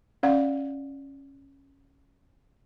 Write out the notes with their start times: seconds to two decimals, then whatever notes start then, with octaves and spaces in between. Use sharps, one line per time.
0.23 C#4 D5 F5 F#5